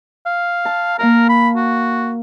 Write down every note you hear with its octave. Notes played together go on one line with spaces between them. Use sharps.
F5
A5
A#3 A#4 F5 A5
B5
F#4